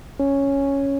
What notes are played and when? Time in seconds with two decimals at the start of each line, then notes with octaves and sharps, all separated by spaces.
0.19 C#4